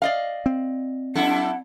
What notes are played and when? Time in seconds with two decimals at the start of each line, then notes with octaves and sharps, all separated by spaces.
0.02 D5 D#5 F5
0.46 C4
1.15 F#2 E4 A4 F#5